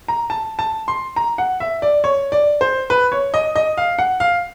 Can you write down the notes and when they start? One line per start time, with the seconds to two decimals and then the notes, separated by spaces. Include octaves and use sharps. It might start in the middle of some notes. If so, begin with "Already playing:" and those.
0.08 A#5
0.30 A5
0.59 A5
0.88 C6
1.16 A#5
1.38 F#5
1.60 E5
1.82 D5
2.04 C#5
2.32 D5
2.61 C5
2.90 B4
3.12 C#5
3.34 D#5
3.56 D#5
3.77 F5
3.99 F#5
4.20 F5